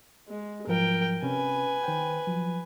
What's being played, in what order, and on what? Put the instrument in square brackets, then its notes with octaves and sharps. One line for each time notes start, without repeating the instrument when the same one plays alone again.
[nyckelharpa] G#3
[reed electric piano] G#2 F3 F#3 [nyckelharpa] A#4 G5
[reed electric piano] C3 C#4 [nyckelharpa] B4 G#5
[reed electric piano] D#3 C5 G5
F3 F#3